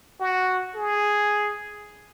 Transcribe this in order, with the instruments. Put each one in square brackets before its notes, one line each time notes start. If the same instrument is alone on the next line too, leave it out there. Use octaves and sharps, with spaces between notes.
[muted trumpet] F#4
G#4